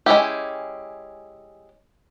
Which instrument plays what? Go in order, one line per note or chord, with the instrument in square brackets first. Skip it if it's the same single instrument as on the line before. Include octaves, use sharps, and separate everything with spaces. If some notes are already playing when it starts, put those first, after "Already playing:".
[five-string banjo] G#3 C#4 E4 G4